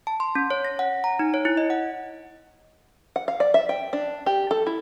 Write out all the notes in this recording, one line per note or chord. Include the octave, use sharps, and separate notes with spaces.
A5
C6
C#4
C#5
A#6
F#5
A#5
D#4
C#5
E4
D#5
F#5
F#5
F5
D5
E5
G5
D4
G4
A4
E4